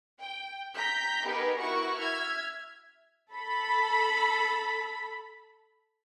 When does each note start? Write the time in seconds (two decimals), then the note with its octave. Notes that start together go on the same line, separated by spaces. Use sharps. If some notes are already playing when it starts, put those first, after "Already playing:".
0.20 G5
0.73 G5 A#5 G6 B6
1.24 B3 D#4 G4 G#4 A#4 B4
1.59 E4 F#4 A#4 F#5 C#6
1.97 E5 F6 G#6
3.33 A4 B5